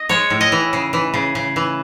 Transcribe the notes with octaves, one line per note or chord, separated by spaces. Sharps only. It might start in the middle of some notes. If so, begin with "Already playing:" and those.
Already playing: D#5
G#3 C#5
A2
D#5
E3
C#3
E3
C#3
C#3
E3